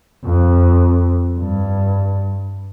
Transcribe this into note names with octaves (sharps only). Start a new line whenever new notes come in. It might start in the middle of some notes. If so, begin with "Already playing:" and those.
F2
G2